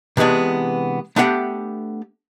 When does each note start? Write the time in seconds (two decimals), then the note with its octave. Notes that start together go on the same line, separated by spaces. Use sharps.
0.17 C3 E3 G#3 B3 D4
1.16 A3 B3 D4 G4 F#5 G5